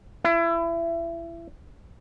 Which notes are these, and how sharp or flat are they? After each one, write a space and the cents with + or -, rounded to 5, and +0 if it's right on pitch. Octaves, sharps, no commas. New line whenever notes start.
E4 +30